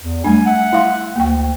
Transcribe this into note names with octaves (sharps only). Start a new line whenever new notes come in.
E2
G3 A3 D4 G#5
E5 F#5
E4 F5 C6
D2 A#3 G5